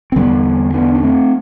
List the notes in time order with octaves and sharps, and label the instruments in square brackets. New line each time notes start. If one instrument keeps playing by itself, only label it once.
[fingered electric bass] C4
E2 D3 G3 B3
B3 D4
D4
A3 C4